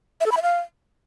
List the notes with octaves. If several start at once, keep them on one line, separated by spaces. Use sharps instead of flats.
E5
A4
B5
E5
F5